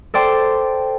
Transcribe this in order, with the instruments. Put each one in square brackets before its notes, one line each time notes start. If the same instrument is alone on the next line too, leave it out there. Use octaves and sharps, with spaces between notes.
[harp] A4 C5 D5 G5